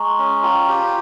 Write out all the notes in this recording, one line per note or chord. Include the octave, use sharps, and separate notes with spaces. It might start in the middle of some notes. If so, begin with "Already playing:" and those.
Already playing: G#3 G#5 A#5 C6 C#6
C#4
F4 G5 A#5
G4